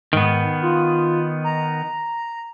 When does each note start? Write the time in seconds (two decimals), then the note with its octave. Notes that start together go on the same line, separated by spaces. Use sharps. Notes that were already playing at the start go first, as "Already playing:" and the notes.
0.13 G#2 D#3 B3
0.63 F4
1.44 A#5